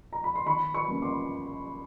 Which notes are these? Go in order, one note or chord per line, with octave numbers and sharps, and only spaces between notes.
A#5
B5
C6
D#3 B5 C#6
B5 C#6
G3 A#3 C#4
C6 D6